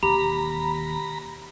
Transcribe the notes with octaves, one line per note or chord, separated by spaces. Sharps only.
E1 D#2 G4 A#5 B5